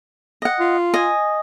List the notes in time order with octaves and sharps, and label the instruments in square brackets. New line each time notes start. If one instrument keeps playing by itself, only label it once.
[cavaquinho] D#5 F#5
[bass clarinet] F4
[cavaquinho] D#5 G#5